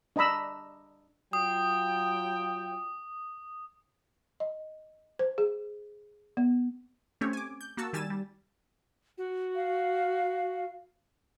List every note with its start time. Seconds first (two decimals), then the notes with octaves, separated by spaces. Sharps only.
0.16 D4 D#5 A#5 B5 E6
1.33 F#3 F4 G5 D#6
4.40 D#5
5.19 C5
5.38 G#4
6.37 B3
7.21 A3 C4 C#4 G4 C#5
7.33 G#5 D6
7.61 G6
7.77 A#3 F#4 A5 E6
7.93 D#3 G3 G#5 E6 A6 E7
8.10 G3
9.18 F#4
9.56 F5